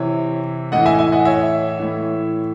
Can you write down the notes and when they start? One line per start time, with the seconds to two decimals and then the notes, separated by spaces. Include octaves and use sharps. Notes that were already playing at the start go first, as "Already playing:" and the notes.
Already playing: C3 E3 C#5
0.72 A2 E3 D#5 F#5
0.86 E5 G#5
0.99 E5 G#5
1.12 D#5 F#5
1.25 C#5 E5
1.80 A2 E3